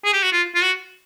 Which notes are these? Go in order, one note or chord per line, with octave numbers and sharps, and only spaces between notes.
G#4
G4
F#4
F4
F4
F#4